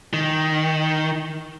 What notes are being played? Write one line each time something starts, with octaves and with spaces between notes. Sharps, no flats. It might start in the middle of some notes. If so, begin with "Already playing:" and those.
D#3